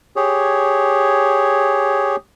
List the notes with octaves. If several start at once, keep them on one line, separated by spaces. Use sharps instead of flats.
G4 G#4 C#5